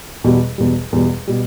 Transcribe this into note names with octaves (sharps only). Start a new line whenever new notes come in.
E2 B2 G3
E2 B2 G3
E2 B2 G3
B2 G3